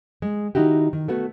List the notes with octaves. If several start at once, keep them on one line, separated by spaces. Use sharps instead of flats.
G#3
D#3 D#4 E4 F#4 G4
D#3
A3 B3 F#4